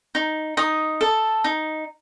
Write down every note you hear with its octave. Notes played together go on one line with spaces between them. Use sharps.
D#4
D#4 D#6
A4
D#4